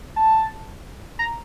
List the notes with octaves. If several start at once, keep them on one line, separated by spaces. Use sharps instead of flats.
A5
A#5